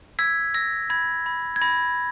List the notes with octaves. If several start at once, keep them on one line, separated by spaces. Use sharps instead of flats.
E6 G#6 B6
E6 A#6
B5 G#6
B5
G#6
B5 A#6